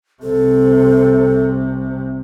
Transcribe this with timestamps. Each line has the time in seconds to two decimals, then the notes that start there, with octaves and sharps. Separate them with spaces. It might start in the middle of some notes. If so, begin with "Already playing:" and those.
0.23 C2 C3 A4